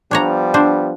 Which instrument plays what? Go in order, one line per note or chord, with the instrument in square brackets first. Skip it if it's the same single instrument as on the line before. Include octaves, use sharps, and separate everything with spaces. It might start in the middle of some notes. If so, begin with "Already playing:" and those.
[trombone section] F3 G3 B3 [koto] D4 C#5 A#5
[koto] D4 C5